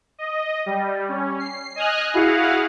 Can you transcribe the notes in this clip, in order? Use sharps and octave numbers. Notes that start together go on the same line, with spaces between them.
D#5
G3
C#4
C7
D#5 G#5 D#6 F6 F#6
E4 F#4 G#4 F5 F#5